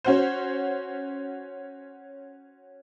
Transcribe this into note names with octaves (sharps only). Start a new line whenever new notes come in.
C#4 F#4 C5